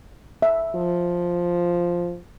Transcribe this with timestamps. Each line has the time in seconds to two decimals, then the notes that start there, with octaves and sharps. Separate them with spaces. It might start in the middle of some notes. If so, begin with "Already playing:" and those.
0.42 E5
0.75 F3